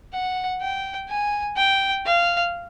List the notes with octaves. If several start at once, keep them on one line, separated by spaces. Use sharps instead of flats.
F#5
G5
G#5
G5
F5